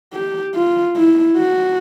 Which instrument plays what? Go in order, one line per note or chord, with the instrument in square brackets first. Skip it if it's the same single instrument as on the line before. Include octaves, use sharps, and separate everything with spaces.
[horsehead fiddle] G4
F4
E4
F#4